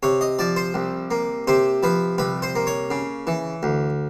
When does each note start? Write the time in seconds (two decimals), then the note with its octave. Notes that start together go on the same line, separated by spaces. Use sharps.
0.03 C3 C#5
0.21 D#5
0.39 F3 D5
0.56 C5
0.74 C2
1.11 A#3
1.48 C3 C5
1.83 F3 B4
2.18 C2 B4
2.42 C5
2.55 A#3
2.67 C#5
2.90 C#3
3.27 E3
3.63 D2